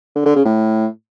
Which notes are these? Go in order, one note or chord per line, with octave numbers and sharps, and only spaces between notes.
D3
D3
C#3
A2